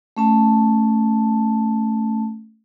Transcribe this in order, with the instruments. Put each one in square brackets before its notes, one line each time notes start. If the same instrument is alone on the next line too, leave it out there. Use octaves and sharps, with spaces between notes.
[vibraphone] A3 C#4 A5